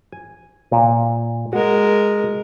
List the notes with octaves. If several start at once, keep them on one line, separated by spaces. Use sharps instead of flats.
G#5
A#2
G#3 F#4 A#4